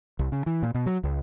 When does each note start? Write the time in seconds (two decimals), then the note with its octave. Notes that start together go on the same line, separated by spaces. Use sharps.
0.19 C2
0.32 C#3
0.46 E3
0.63 A#2
0.75 B2
0.86 F#3
1.04 C#2